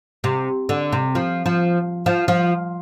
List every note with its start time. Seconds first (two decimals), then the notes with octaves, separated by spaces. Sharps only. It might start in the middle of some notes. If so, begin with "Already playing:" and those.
0.24 C3
0.69 D3
0.92 C3
1.15 F3
1.46 F3
2.06 F3
2.28 F3